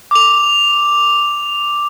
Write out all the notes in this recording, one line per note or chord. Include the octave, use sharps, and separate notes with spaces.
D6 F7